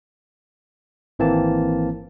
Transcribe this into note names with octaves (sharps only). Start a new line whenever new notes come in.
G#1 E3 A#3 C4 A5